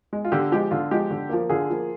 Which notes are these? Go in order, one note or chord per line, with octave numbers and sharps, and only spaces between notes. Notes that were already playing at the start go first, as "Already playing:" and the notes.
G#3
F4
D3 G4
F3 G#3 G4
D3 F4
F3 G#3 G4
D3
F3 A#3
D3 F4 G#4
F3 A#3